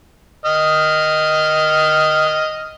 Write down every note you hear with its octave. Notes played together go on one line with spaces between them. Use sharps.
D#5 F6